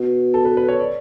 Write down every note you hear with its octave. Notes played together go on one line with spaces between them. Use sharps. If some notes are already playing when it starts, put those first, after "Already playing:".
Already playing: B2
A4
B4
B4
C#5
D5